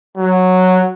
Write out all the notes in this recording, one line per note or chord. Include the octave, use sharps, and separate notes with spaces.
F#3